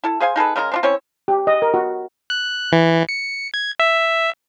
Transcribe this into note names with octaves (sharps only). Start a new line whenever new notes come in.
E4 A4
G#4 C5 F5 G#5
D#4 G#4 A4 B4
C#3 G#3 D#4 A#4
C4 D4 F4
C4 C#4 E4 C#5
G4
D#5
A#4
F#4
F#6
E3
C#7
G#6
E5